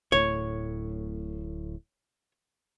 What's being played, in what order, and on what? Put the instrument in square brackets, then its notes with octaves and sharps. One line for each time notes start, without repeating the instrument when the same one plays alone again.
[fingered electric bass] D1 A2 [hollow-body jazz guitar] C#5